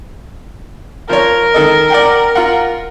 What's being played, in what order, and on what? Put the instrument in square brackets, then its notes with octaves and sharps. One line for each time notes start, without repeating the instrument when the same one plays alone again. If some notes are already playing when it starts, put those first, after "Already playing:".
[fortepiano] F3 C#5 [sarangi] A#4
[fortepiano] D#3 A4 D#5
D5 F#5 G5
F4 F#5